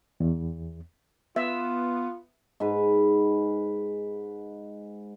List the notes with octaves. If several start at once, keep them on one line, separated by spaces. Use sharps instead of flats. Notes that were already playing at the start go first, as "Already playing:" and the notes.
E2
B3 F4 E5
G#2 B4